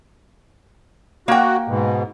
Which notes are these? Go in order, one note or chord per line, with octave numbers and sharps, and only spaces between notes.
A#3 F#4 G5
G#2 B2